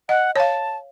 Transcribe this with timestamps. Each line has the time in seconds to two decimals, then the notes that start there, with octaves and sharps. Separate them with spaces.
0.09 D#5 F#5
0.36 C#5 F5 A5